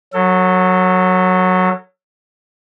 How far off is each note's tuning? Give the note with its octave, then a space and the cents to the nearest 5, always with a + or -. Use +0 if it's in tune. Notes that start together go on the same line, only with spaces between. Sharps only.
F#3 -10 A4 +30